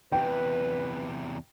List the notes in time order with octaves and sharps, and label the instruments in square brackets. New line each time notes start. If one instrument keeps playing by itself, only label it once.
[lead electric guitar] E2 C3 [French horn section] B4 [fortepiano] G5